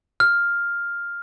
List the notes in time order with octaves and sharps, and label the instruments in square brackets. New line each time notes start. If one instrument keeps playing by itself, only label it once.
[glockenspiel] F6